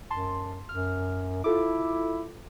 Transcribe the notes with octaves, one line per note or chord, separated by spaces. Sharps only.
F#2 A5 C6
F#2 F6
E4 F4 A4 D6